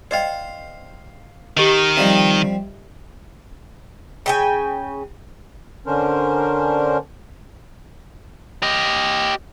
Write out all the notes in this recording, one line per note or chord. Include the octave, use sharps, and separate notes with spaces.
C5 D5 D#5 F5 G5
D#3 G4 D#5
F3 G3 C4 D#5 E5
C#3 G5 G#5
D3 C#4 D4 A#4 C5
G4 D#5